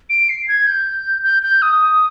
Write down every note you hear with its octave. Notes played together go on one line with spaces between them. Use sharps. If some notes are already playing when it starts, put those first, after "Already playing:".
D7
C7
G#6
G6
G6
G6
D#6